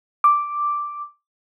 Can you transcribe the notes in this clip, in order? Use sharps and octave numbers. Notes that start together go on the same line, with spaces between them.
D6